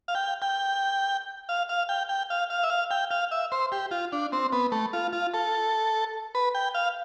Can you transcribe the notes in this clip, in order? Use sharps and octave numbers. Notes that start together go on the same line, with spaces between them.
F5
G5
G5
F5
F5
G5
G5
F5
F5
E5
F5
G5
F5
E5
C5
G4
F4
D4
C4
B3
A3
F4
F4
A4
B4
G5
F5